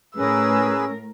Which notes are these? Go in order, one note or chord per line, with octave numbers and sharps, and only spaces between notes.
A2 C#4 G#4 A#4 B4 E6